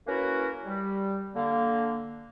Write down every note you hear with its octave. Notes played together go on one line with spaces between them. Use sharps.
A#3 C#4 E4 F#4 A#4 B4
G3
D3 A#3